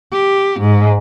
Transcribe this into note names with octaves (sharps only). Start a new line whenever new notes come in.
G4
G#2